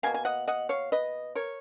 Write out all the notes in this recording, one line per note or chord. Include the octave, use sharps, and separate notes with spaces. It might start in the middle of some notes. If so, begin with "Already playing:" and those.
B2 A#3 F5 G#5
G#5
D#5 F#5
D#5 F#5
C#5 F5
B4 D#5
A#4 C#5